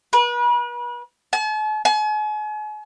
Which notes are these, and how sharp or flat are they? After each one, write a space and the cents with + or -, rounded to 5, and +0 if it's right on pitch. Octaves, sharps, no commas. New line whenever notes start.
B4 -40
A5 -45
G#5 +40